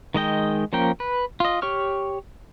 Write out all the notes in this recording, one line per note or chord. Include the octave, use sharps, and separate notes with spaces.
D#3 G#3 D#5 G5
F3 A#3 C#4 A#4 G5
B4
F4 D#5
G4 C#5 C#6 F6